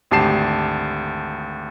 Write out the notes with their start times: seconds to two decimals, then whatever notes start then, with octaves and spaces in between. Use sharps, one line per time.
0.11 G#1 D2 G4 A5 C7 E7